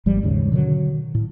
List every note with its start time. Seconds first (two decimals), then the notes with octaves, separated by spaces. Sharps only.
0.06 G#1 F3 G3
0.23 D#2 G#2 C#3
0.52 B2 D3 D#3 F#3
1.15 A2